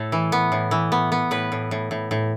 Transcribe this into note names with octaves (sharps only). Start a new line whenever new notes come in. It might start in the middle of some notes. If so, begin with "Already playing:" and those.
Already playing: A2 A4
E3
B3
A2
E3
B3
B3
A2 B4
A2
A2
A2
A2